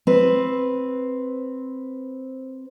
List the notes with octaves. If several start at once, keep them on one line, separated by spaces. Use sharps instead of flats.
C4 B4